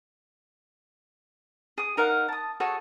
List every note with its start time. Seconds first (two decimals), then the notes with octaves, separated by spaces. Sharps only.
1.78 G#4 D#6
1.97 D#4 A#4 F5 F#5
2.28 A5 D#6
2.60 F#4 G#4 A4 C#5